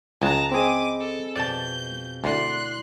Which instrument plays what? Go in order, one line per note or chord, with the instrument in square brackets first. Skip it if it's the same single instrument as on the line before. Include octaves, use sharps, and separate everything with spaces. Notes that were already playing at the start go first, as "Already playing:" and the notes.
[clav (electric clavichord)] C#2 G#3 [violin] A5 A#5 [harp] F#6 A#6
[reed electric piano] C4 G#4 [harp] D#5 G#5 B5 [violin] D6 D#7
[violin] A4
[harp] F2 B2 [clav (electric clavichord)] D5 A5 [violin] G6
[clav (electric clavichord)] D2 [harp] E4 D5 [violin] C6 F#6